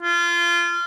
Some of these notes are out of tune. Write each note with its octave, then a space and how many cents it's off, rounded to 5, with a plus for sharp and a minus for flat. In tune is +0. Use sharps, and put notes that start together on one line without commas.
F4 -25